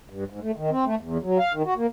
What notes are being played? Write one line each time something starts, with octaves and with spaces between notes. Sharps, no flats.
G2
G#2
A3
D#3
C4
A3
E2
F#3
F5
D#3
F#4
A#3